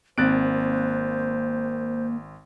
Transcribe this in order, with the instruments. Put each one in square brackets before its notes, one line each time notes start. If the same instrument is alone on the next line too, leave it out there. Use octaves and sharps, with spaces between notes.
[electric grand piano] G#1 F#6 D7 [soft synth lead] A#3 [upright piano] C4 A6 [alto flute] C5